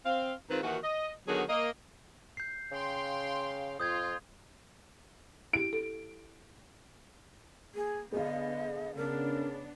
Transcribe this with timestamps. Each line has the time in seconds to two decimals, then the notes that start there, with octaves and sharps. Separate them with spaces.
0.06 C4 F5
0.50 D#3 G#3 C4 F4 B4
0.63 D#2 D#3 E3 F#4
0.83 D#5
1.27 D3 D#3 F#3 B3 G#4
1.49 A#3 D#5
2.37 G6 C7
2.72 C#3 F5 G5 C6
3.80 F2 F4 D#6 G6 G#6
5.53 E4 G4 D7
5.73 A4
7.75 A#3 G#4
8.12 D3 B3 G#4 D#5 F5
8.96 C#3 B3 D4 A#4